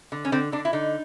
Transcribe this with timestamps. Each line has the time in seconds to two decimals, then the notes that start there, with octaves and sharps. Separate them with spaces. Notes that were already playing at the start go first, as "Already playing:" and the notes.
0.12 D3
0.25 C#4
0.32 D3 C4
0.52 D3 D4
0.65 E4
0.73 D3 D#4